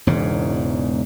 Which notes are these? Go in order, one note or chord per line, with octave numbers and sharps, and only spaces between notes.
E1 E2 G#2 C#3